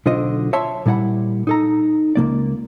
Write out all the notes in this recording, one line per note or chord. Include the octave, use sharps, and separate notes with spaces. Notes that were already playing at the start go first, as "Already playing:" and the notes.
B1 D3 F4 C5 D#5
C#5 D5 E5 A5 C6
A#2 G3 E4 D5 F#5 B5
D#4 A4 A#5
C#2 E3 A#3 D5